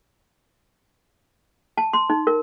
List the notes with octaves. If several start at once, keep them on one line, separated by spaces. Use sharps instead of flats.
A5
C6
D#4
A#4